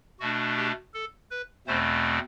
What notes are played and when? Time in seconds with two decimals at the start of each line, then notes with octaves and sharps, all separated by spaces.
0.20 B2 A3 D4 F#4
0.57 G4
0.94 A4
1.31 B4
1.67 E2 B2 A3 C4 C5